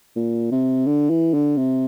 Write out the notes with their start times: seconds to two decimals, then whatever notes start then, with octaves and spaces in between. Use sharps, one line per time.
0.16 A#2
0.51 C3
0.86 D3
1.10 E3
1.34 D3
1.57 C3